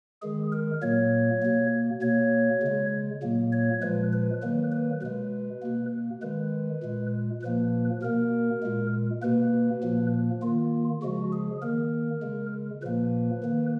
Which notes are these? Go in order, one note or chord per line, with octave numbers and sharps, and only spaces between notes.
D#3 G#3 G#4
A#4
A#2 F#3 A#3 C#5
B2 A#3
B2 A#3 C#5
C#3 G#3
A#2 F#3 A#3
C#5
A#2 F3 G#3 B4
B4
D#3 F#3 A#3 B4
B4
B2 G#3 B4
B2 A#3
D#3 G#3 B4
A#2 G#3
A#2 F3 A#3 B4
B2 A#3 A#4
A#2 G#3
B2 A#3 B4
A#2 F3 A#3
D#3 A#3 F4
C#3 F3 G#3 F#4
G#4
D#3 A#3 A#4
C#3 G#3
A#2 F3 A#3 B4
D#3 A#3